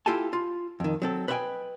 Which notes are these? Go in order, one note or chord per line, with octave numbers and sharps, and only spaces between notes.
E4 F4 G4 A4 G#5 A5
F4
F2 D#3
F#3 C4 A4
B4 C5 D#5 E5 G5 G#5